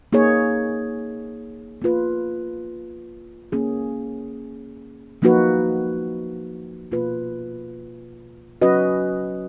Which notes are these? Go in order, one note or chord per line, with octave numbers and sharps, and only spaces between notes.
A#3 D#4 G#4 C#5
A#3 F4 B4
A#3 C#4 G#4
F3 A#3 D#4 F#4 B4
B2 A#3 F4 B4
F#3 C#4 F#4 B4 D#5